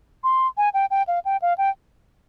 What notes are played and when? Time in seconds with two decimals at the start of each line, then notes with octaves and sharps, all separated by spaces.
0.24 C6
0.57 G#5
0.74 G5
0.91 G5
1.07 F5
1.25 G5
1.42 F5
1.58 G5